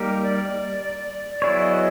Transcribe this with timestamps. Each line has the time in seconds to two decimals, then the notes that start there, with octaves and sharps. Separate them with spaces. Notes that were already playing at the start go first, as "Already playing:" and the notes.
Already playing: G3 A#3 D#4 G4 A#4
0.23 D5
1.42 F#3 B3 E4 G#4 C#5 D5
1.62 D#5